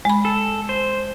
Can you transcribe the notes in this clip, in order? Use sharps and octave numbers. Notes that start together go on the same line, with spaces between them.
G#3 B5
A4
C5